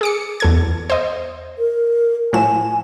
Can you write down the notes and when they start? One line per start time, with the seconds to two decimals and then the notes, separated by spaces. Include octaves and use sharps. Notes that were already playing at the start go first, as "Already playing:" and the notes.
0.01 G#4 D6 C#7
0.40 E2 A4 G#6
0.90 C5 D#5
1.58 A#4
2.33 A2 F3 G#5 E7